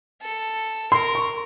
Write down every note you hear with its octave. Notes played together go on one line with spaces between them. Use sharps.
A4
A#4 C6
C#6